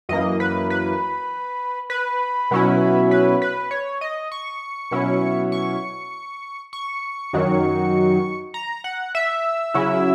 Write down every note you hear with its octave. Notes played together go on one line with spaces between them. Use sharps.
F#2 E3 A#3 D#5
B4
B4
B4
B2 F#3 C#4 E4
B4
B4
C#5
D#5
C#6
B2 F#3 C#4 E4
C#6
C#6
F#2 D#3 F#3
A#5
F#5
E5
C#3 F#3 C#4 E4